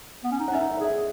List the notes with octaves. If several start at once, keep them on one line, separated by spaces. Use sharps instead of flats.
B3
C#4
D#4
F#5
C#4 E5
D#4
E5
G#4 E5